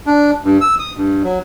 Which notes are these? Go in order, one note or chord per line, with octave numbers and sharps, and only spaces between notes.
D4
G2
E6
D#6
G2
F#3